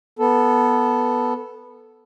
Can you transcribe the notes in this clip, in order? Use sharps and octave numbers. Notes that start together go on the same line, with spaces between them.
B3 A4